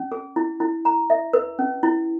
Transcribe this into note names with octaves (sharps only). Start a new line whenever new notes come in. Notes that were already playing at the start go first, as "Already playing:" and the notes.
Already playing: C#4
G#4
E4
E4
A#5
E5
B4
C#4
E4